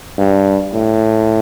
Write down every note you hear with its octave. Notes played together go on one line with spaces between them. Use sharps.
G2
A2